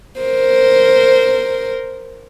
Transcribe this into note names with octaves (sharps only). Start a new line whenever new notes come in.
A#4 C5